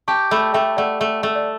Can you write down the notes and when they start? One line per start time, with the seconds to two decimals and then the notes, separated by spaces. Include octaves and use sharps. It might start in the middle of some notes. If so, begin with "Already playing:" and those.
0.08 G4 A5 C#6
0.31 A3 G5 B5
0.54 A3 E5 G5
0.77 A3 D5 F#5
1.01 A3
1.23 A3
1.36 D5